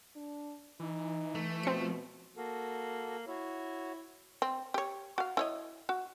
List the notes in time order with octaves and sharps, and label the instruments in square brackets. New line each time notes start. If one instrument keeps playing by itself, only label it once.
[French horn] D4
[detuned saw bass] E3 [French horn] D#4
[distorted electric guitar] A3
[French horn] B2 [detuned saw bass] F3 [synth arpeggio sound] C4 C#7
[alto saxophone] A#3 [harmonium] F#4 A4
[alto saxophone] E4 [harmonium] F#4 C#5
[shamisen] C4
G4 C#5
F#4 F5
E4 C#5 D#5
F#4